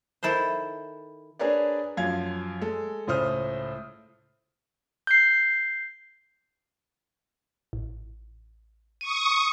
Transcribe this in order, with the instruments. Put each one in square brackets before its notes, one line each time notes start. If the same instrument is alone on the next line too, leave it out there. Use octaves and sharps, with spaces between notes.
[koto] D#3 E4 A4 B4 C5
[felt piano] D4 G#4 A#4 B4 C#5 D5
F#2 F3 F5 G#6
G#3 A4
C#2 A2 C5 D#6 F6
[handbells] G6 C7
[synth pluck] A1
[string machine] C#6 D#6 [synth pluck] D#7